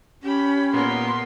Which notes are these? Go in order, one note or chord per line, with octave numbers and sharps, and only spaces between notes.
C#4 G4 B5
A#2 B3 A#4 C6